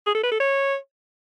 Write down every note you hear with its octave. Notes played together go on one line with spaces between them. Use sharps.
G#4
A4
B4
A4
C#5